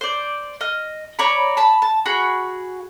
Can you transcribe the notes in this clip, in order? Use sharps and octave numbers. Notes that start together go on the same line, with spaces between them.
C5 D5
D#5 F6
C#5 D5 A#5 B5
A5 B5
A5
F#4 G#4 F#5 B5